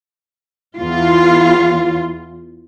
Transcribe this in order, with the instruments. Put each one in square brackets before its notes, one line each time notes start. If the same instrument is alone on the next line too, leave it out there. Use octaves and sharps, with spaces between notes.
[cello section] E2 F4